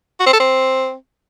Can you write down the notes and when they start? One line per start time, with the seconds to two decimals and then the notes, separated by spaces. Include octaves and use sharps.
0.20 F#4
0.26 C4
0.33 A4
0.40 C4